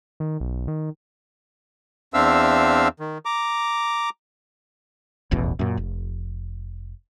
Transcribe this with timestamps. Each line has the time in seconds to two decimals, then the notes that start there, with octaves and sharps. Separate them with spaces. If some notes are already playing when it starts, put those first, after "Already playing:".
0.20 D#3
0.40 B1
0.68 D#3
2.14 E2 C4 D4 E5 F5 E6
3.00 D#3
3.25 A#5 D6
5.31 D#1 A1 E2 B2
5.59 F#2 A#2
5.77 F1